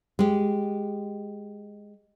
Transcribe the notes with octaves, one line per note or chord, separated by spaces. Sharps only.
G#3 G4